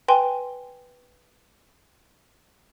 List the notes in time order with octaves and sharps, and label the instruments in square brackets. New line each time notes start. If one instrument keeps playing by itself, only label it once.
[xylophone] B4 G5 G#5 C6